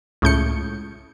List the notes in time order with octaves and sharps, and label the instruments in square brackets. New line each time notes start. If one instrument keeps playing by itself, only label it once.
[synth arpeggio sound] C#2 A2 G6 C#7